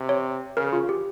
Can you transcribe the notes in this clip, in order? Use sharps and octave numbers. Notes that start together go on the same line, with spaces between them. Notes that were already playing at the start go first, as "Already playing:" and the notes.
Already playing: C3
C#5
C#3 A#4
F4
G4